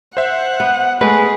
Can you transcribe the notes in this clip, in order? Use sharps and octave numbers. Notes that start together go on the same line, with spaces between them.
C5 E5 F#5
B3
G#3 A3 G#4 B4